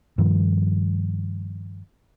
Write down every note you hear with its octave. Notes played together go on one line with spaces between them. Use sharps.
G2 D#3 F3